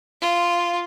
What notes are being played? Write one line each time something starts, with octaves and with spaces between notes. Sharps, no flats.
F4